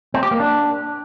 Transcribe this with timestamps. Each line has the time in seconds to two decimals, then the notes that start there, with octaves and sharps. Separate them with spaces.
0.14 C4
0.23 G4
0.31 A#3
0.40 D4